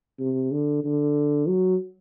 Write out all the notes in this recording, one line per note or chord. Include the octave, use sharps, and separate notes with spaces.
C3
D3
D3
F#3